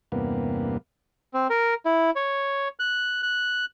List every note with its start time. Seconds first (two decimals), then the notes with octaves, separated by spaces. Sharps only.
0.12 E2 G2 C3 A#3 B3
1.34 C4
1.50 A#4
1.86 E4
2.16 C#5
2.80 F#6
3.23 F#6